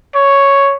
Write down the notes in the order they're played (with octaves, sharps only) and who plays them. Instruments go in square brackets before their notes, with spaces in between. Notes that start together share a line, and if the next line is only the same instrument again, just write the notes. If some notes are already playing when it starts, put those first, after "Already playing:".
[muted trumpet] C#5